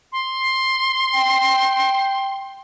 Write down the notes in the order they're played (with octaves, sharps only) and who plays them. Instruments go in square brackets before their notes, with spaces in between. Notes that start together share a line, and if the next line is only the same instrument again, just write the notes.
[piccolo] C6
[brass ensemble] G5